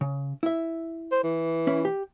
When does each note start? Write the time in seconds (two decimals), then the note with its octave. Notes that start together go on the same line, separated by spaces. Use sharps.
0.01 C#3
0.43 E4 E5
1.12 C5
1.24 E3
1.67 C#4 E4
1.85 G4